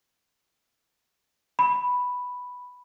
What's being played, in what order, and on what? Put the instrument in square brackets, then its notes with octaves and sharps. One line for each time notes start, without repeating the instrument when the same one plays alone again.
[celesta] B5